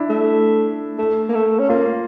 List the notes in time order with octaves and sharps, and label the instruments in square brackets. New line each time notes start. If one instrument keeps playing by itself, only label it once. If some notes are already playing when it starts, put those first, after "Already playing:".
Already playing: [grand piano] D4 E4
[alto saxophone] A3
A3
A#3
A3
C#4
[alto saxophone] A#3 [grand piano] F4